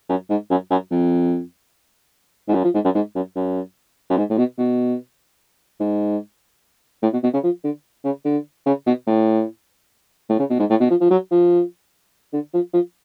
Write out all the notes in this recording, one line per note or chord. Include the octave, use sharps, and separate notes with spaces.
F#2
G#2
F#2
F#2
F2
G#2
F#2
F3
G#2
F#2
G#2
F#2
F#2
F#2
G#2
A2
B2
B2
G#2
A2
B2
B2
C#3
F3
D3
C#3
D3
C#3
B2
A2
A2
C#3
B2
G#2
A2
B2
F3
F3
F#3
F3
D3
F3
F3